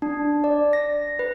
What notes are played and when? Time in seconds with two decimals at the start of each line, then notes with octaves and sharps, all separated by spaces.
0.02 D4
0.44 D5
0.73 A#6
1.19 B4